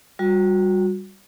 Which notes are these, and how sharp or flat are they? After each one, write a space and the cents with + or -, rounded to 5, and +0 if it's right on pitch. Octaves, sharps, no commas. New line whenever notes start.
G3 +0 F#4 -25